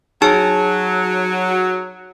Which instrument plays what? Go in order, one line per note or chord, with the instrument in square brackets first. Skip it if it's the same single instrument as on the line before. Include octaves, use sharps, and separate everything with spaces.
[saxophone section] F#3 [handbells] D#4 G#4 A5